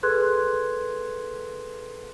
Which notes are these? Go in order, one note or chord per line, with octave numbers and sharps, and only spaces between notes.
G#4 A4 B4 C6 F#6 G#6